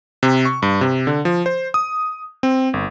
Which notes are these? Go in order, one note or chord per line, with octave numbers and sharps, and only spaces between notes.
C3
C#6
G2
C3
D3
F3
C5
D#6
C4
G1